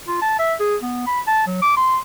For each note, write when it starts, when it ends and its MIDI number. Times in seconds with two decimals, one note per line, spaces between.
0.08 0.20 65
0.22 0.34 81
0.39 0.54 76
0.60 0.76 68
0.82 1.03 59
1.07 1.20 83
1.27 1.45 81
1.47 1.60 54
1.62 1.74 86
1.77 1.99 84